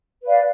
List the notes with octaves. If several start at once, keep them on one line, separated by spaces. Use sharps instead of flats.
B4 D5 F5